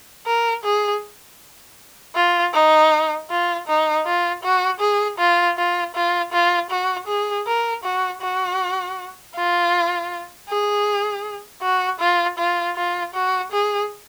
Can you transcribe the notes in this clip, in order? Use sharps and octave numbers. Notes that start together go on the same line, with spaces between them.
A#4
G#4
F4
D#4
F4
D#4
F4
F#4
G#4
F4
F4
F4
F4
F#4
G#4
A#4
F#4
F#4
F4
G#4
F#4
F4
F4
F4
F#4
G#4